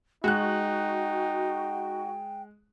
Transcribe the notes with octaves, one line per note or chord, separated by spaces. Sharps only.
G#3 D#4 F#4 G5 F#6